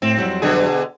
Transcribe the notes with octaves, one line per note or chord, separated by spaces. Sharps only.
A2 C4
F2 F#3 G3
B2 D3 G#4